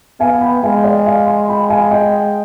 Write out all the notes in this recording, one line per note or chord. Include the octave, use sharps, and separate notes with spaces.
B3 F5 G#5
G5 B5
G#3 F5 G#5
G5
D5 F5
F5 G#5
G#5 C6
G5 B5
F5 G#5
D#5 G5